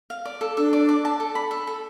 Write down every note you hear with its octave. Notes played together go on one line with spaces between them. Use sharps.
F5
D5
A4
D4 A4
D5
D5
A5
A4
B5
A4
A4